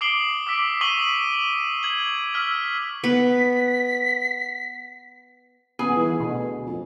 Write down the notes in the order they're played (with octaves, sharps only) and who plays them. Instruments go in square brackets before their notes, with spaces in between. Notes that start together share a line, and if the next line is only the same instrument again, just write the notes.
[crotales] D6 D#6 C7 D7 F#7 G7
D6 E6 B6 D7
C#6 D#6 B6 D#7 F#7 G7
G#6 F#7
E6 F6 B6
[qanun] B3 [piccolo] B6
[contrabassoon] D#1 [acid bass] B3 [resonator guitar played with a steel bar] G#4 G#5
[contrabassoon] E3
[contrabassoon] D2 [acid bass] B2
[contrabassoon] F2